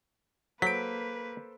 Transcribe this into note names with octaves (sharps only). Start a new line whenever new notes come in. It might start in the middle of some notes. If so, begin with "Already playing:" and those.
F#3 A#3 A4 B4 C5 G6 B6 D7